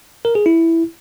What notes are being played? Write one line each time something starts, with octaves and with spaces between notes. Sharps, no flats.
A#4
G#4
E4